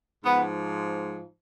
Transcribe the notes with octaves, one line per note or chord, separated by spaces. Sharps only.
G#2 F3 B3